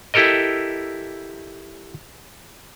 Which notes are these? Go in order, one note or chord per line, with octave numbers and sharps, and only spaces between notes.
E4 G4 A4 A#4 D#5